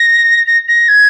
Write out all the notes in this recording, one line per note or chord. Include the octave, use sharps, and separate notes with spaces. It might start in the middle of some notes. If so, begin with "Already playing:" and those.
Already playing: A#6
A#6
A#6
G#6